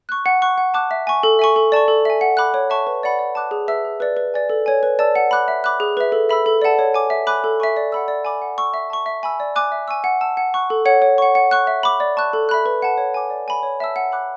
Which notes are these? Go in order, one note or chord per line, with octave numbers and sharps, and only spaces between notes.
C#6 F#6
F#5
C#6 F#6
F#5
A5 D6 F#6
E5
G#5 C#6
A4
E5 G#5 C#6
A4
D5 A5 C#6
A4
E5 G#5
F#5
B5 D6 F#6
C#5
E5 A5 C#6
B4
D5 F#5 B5
D5
A5 D6 F#6
G#4
B4 E5 A5 E6
G#4
B4 D5
B4
D5 G#5
A4
C#5 G#5
B4
D5 A5 E6
F#5
B5 D6 F#6
E5
B5 D6 F#6
G#4
B4 E5
A4
E5 B5 E6
A4
D5 F#5 A5
C#5
G#5 D6
E5
G#5 B5 D6 F#6
A4
E5 G#5 C#6
D5
F#5 B5 E6
D5
G#5 B5 D6
F#5
C#6 E6
E5
A5 C#6
E5
G#5 B5 E6
D5
G#5 D6 F#6
E5
G#5 C#6 E6
F#5
A5 E6
F#5
C#6 F#6
A4
C#5 F#5
C#5
F#5 C#6
F#5
C#6 F#6
E5
B5 D6
D5
A5 C#6 F#6
A4
E5 B5 F#6
B4
F#5 A5
C#5
G#5 D6
D5
G#5 B5
C#5
E5 A5 E6
F#5
B5 D6 F#6